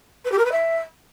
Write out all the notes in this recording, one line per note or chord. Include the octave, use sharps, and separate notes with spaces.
B4
G4
A#4
B4
E5